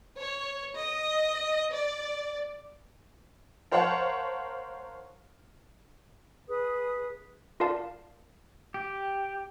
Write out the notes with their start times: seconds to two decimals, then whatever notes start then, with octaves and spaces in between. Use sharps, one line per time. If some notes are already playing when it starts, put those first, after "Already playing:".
0.19 C#5
0.78 D#5
1.73 D5
3.71 A#4 C5 C#5 F5 F#5 A5
6.47 G#4 B4 D#6
7.60 F4 A#4 D5 F5 A5
8.74 G4